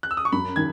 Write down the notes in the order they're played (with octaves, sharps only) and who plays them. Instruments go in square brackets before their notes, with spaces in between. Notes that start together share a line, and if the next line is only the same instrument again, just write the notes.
[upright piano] F#6
E6
D#6
C#6
[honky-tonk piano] F#2 [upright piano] B5
[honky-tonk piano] D#3 [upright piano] G#6